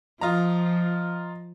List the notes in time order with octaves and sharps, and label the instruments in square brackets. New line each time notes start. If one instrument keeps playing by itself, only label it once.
[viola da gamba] F3 [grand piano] F4 D#5 A#5